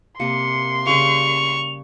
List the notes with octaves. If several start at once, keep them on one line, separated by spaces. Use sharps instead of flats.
C3 A#3 C6 C#7
C#3 G3 C#6 F7